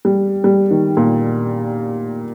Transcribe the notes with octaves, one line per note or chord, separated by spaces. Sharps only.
G3
G3
D#3
A#2